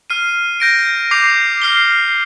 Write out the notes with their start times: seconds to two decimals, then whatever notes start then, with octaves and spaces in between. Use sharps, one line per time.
0.10 F6 C7 D#7
0.60 G6 A#6 D7
1.11 D6 G6 C7 F7
1.62 F6 C7 G7